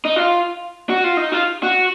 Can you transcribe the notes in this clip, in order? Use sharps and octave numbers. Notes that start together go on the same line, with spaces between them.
D#4
F4
F#4
F4
D#4
F4
F#4